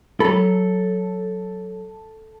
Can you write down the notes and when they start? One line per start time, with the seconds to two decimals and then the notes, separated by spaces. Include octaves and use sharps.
0.20 F#3 A4 B5